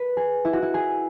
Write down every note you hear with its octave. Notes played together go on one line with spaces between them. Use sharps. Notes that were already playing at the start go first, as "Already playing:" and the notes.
Already playing: B4
G#4
E4
F#4
E4
G#4